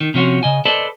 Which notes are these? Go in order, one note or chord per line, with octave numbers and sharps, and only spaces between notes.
D#3
C3 F3 C#4 F#4
C#3 D#5 G#5
A4 B4 C5 D5 D#5 A5